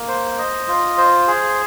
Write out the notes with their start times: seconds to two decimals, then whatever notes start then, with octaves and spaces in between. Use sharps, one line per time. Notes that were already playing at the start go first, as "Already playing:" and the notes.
Already playing: A#3
0.08 C5
0.38 D#5
0.68 F4
0.98 C5
1.27 G#4